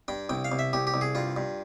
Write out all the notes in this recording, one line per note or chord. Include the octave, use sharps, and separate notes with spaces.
G2 G5
C2 G5
F5
C2
E5
C2 G4
G4
C2
G#4
G2 F4
G2